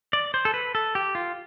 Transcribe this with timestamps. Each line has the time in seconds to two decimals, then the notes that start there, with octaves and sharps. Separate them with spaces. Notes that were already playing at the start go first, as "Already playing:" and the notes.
0.13 D5
0.34 C5
0.45 A4
0.54 B4
0.75 A4
0.95 G4
1.15 F4